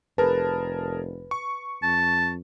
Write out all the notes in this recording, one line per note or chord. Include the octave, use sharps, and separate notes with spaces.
F1 G#4 A#4 B4 A5
C#6
F2 A5